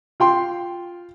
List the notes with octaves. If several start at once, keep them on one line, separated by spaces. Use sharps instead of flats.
F4 G5 C6